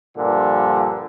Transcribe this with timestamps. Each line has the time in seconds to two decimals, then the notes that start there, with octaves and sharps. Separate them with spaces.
0.17 G2 A#2 D3 F3